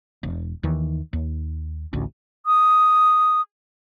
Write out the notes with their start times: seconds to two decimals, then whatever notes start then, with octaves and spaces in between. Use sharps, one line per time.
0.23 E1
0.63 D#2 D#3 E3
1.13 D#2
1.93 A1 D2
2.46 D#6